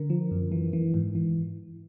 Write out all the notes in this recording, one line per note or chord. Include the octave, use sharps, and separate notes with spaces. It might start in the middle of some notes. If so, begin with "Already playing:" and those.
Already playing: D3 A#4
F3
F#2
E3
E3
G#2
E3